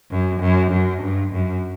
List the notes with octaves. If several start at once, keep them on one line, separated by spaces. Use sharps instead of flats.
F#2
F#2
F#2
G2
F#2